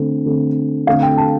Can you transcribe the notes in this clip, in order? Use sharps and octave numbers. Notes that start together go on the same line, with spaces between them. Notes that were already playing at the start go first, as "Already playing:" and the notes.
Already playing: D3 A3 C4
D3 A3 C4
D3 A3 C4 F5
G5
A5